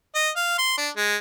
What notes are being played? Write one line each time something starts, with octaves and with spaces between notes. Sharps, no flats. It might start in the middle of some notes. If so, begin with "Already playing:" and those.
D#5
F5
C6
D4
G#3